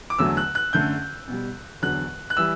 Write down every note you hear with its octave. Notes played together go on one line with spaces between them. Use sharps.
D6
E2 D3 F#3 A3 E6
F#6
F#6
F#2 D3 A3 G6
B2 G3
E2 D3 F#3 F#6
F#6
E3 G3 E6